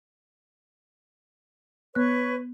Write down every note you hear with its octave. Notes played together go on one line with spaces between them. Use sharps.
B3 B4 C#5 C#6 F#6